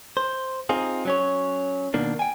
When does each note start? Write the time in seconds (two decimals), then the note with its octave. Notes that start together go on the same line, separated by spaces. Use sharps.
0.17 C5
0.69 C4 D#4 F4 G#4
1.05 F#3 C#4 C#5
1.94 B2 D#3 A#3 D4
2.19 G5 G#5